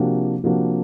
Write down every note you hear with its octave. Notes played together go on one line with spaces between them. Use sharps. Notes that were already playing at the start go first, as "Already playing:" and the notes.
Already playing: C3 F3 A#3 D4 F#4
C3 F3 A#3 D4 F#4